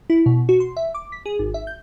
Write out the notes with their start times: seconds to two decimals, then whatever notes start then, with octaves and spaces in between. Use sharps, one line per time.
0.10 E4
0.26 B2
0.49 F#4
0.60 C6
0.77 E5
0.94 D6
1.12 B6
1.26 G#4
1.39 G#1
1.54 E5
1.67 G6